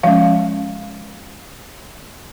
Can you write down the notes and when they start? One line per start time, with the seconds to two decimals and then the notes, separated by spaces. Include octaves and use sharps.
0.03 F3 G#3 C#4 F5